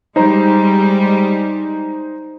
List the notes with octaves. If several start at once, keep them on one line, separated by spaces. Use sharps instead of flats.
G3 G#3 D#4 C5 A#5